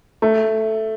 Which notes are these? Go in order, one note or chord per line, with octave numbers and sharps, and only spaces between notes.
A3